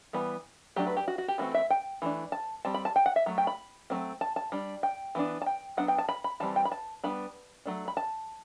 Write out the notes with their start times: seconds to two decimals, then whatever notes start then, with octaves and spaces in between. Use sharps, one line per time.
0.13 E3 G3 B3
0.76 F#3 A3 D4 G4
0.87 B4
0.96 G4
1.08 F#4
1.18 F#4
1.28 G4
1.38 E3 A3 C4 F#4
1.54 E5
1.70 G5
2.02 E3 A3 D4
2.32 A5
2.65 G3 C4 A5
2.74 B5
2.85 A5
2.96 G5
3.06 F#5
3.16 E5
3.26 F#3 A3
3.38 G5
3.47 B5
3.90 F#3 A3 C4
4.21 A5
4.36 A5
4.52 G3 D4
4.83 G5
5.15 E3 B3 D4
5.42 A5
5.46 G5
5.77 F#3 B3 D4 F#5
5.88 G5
5.98 A5
6.09 B5
6.24 B5
6.40 E3 G3 C4 A5
6.56 G5
6.65 B5
6.72 A5
7.04 G3 B3 D4 B5
7.65 F#3 A3 D4
7.88 B5
7.97 A5